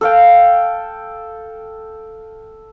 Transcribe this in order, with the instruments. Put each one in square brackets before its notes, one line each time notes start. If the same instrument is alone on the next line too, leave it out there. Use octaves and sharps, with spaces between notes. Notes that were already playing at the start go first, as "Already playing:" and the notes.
[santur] A4 F5 G5